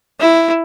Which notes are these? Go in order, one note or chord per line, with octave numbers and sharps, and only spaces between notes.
E4